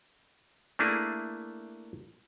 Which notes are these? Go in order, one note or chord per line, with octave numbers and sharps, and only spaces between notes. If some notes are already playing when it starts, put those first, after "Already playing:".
A3 A#3 D4 E4 G#4